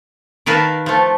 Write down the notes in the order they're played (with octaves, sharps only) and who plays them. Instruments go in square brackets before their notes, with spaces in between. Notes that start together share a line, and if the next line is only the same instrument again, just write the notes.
[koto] D#3 A#4 B4 F5 A5
F3 A3